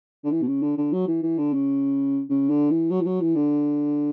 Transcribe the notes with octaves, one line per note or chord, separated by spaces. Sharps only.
D3
E3
B2
C#3
D3
D3
F#3
E3
E3
D3
C#3
C#3
D3
E3
F#3
E3
F#3
E3
D3